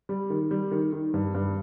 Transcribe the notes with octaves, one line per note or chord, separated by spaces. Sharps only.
G3
D#3
G3
D#3
D#3
G2
G2